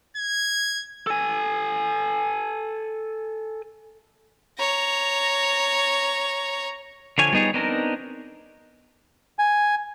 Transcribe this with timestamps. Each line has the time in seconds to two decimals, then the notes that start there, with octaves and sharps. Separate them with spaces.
0.17 G#6
1.07 A4 G#5
4.58 C#5 A#5
7.18 D3 F3 C#5 G#5
7.32 G3 B3 D#4 G#4 C#5
7.54 B3 C4 D4 D#4 A#4
9.39 G#5